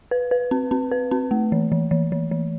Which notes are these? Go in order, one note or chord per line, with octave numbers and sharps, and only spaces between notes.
B4
B4
C4
C4
B4
C4
A3
E3
E3
E3
E3
E3